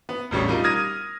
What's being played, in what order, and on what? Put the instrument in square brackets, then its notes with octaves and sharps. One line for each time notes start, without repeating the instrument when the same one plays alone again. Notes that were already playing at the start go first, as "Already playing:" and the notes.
[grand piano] B3
E1 A1 G3 C#5
G3 D#4 F4 A#4
D#6 F6 G#6 A#6 D#7